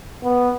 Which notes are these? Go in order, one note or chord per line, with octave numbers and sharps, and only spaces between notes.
B3